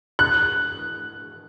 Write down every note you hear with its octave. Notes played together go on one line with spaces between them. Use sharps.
F#6